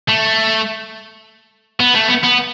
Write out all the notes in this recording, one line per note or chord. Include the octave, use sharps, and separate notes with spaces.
A3
B3
A3
B3
B3